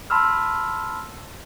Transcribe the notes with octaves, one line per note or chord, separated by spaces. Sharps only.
A5 B5 C6 E6 F6